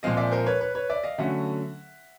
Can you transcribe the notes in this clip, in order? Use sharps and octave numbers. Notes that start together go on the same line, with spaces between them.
A#2 F3 G#3 C4 D#5 F5
D5 E5
A#4 C5
B4 C#5
B4 C#5
B4 C#5
D5 E5
D#5 F5
D3 F#3 A3 C#4 E5 F#5